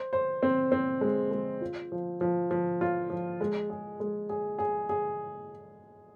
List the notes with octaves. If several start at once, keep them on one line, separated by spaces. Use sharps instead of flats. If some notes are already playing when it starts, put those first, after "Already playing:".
Already playing: C5
C5
C4
C4
G#3
G#3
F4
F3
F3
F3
F4
F3
G#3
G#4
G#3
G#4
G#4
G#4